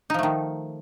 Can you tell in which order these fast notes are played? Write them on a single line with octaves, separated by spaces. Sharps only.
D#4 F3 A3 D#3